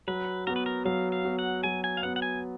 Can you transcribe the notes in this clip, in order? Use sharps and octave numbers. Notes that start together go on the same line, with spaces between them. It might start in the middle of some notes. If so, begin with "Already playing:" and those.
F#3 B4
B3 F#4 A#4
B4
A#4
F#3 F5
F5
B3 F#4
F#5
F#3 G#5
G#5
F5
B3 F#4 F#5
F#5
G#5